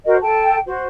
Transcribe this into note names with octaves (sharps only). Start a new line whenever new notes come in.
F#4 A#4 C5 D#5
A4 G5 A5
F#4 C5